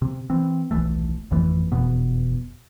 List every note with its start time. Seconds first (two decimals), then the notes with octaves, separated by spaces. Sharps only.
0.02 C3
0.30 E3 C4
0.71 D#1 B1 E3 A3
1.31 G#1 F2 E3 A3
1.72 F1 E2 B2 B3